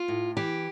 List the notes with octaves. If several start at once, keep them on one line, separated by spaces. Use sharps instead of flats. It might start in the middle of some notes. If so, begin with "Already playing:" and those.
Already playing: F4
A2
E3 G4